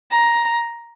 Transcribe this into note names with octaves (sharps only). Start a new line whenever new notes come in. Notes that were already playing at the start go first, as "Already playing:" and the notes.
A#5